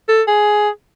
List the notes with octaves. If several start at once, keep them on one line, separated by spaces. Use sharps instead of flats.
A4
G#4